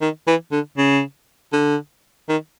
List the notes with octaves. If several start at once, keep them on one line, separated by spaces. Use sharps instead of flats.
D#3
E3
D3
C#3
D3
D#3